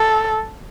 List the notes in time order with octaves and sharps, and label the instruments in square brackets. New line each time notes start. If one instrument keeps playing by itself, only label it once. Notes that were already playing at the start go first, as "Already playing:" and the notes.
Already playing: [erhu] A4